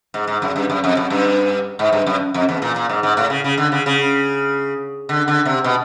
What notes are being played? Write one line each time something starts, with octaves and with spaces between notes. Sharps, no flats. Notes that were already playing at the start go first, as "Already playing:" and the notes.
G#2
G#2
F#2
G2
F#2
F2
F#2
G2
G#2
G2
F#2
F2
E2
A#2
A#2
G#2
G#2
A2
C#3
C#3
D3
C#3
C#3
D3
D3
C3
B2